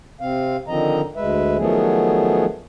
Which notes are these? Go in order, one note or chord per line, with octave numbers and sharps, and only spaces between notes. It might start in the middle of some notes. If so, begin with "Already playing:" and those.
C3 C4 F5
D3 D#3 F3 C4 D#5 A#5
D2 G#3 B4 E5
D#3 F3 F#3 A3 B3 G#4